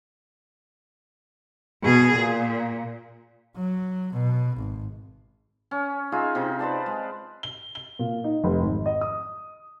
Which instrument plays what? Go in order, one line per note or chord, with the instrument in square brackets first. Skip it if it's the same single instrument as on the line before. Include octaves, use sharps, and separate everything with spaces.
[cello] B2 G#4
A#2
[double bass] F#3
B2
G#1
[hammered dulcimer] C#4
D#4 F4 G#4 E5
C3 D#4
B4 C5 D5 A5
G#3
[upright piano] G7
G7
A#2
D#4
F1
G#1
D#5
D#6